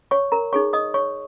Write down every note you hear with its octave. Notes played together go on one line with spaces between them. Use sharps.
C#5 C#6
A#4 A#5
D#4 G#4 C#5 C#6
D#5 D#6
C#5 C#6